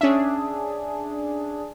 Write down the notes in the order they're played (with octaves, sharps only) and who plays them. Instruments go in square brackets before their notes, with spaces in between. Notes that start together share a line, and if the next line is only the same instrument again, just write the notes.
[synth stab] C#4 E5 [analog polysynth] D4 G#4